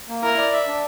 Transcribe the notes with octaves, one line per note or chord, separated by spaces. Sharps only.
A#3
E4 A#4
D5
E5
D4